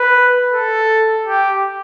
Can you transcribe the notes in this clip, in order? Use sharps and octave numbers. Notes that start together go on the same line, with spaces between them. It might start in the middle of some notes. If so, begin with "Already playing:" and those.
Already playing: B4
A4
G4